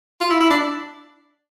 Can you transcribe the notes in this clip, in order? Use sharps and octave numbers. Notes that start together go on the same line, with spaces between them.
F4
E4
E4
D4